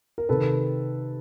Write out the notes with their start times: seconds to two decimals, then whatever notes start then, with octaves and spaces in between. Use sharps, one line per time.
0.18 A#4
0.29 C3 D#3 A4 B4